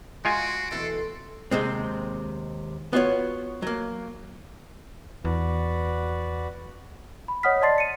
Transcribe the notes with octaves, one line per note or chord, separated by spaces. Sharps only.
G#3 F4 F#4 G#5 C6 C7 D7
B2 E3 A3 A4
D#2 C3 G#3 C4
B3 F4 F#4 C#5
F#3 A#3
E2 F#4 B4 D5
B5
C#5 D#5 F#5 D#6 F6 B6
D5 D#5 A5 C6 A6 C7
C#7 D#7